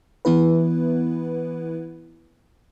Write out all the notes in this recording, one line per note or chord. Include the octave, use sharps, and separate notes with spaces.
E3 B3 E4 B4